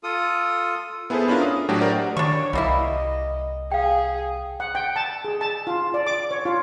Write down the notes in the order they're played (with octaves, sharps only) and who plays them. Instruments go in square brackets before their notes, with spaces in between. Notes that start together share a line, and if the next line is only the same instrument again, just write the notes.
[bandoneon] F4 A4 D#6
[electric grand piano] B3 E4 G#4 A4 B4 C5
C#4 D4 E4 F4 A#4
D#6
A2 F#3 A3 D4 F#4 G4
G4 A#4 C5 D5 F#5
[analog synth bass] D#3 [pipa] D4 C#6 [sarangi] C#5
[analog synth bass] C2 [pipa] G3 A#3 E4 [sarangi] D#5
[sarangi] G#4 [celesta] F5 G5
[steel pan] F#5
G5
A5
G#4
A5
F4
D5
D6
C#5
F4